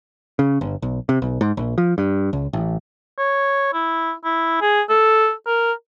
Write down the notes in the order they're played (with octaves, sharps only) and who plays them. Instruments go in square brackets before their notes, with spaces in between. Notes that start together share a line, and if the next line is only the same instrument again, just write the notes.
[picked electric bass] C#3
G1
B1
C3
B1
G#2
A#1
F3
G2
C#2
A1
[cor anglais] C#5
E4
E4
G#4
A4
A#4